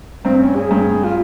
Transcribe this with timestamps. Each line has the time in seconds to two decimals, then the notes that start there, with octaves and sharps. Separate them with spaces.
0.25 G2 C4
0.40 C#4
0.55 G#4
0.71 G2
1.04 F4